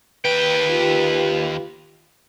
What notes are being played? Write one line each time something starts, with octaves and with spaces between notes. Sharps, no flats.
D#2 B4 G5
F4 G4